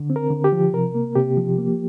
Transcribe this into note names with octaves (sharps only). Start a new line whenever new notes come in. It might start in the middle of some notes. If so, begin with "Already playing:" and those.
Already playing: D3
C4
A#4
D3
G4
F3
C3 A#4
A#3
C3 G4
F3
A#3